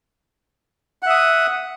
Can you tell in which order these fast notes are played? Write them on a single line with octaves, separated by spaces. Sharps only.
F#5 E5 D#6